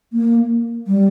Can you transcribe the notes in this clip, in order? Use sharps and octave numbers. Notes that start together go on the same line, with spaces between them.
A#3
G3